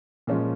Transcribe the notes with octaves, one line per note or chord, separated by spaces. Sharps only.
A#2 F3 G#3 C#4